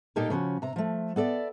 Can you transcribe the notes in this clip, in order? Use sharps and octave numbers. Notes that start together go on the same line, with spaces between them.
A#2 A#3 D#4 G4 A4 A#4
C#3 F3 C#4 F#4
C3 A#5
F3 A3
B3 A4 D5 E5